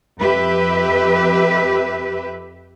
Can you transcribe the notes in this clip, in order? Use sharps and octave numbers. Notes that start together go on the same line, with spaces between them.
F2 G4 B4 E5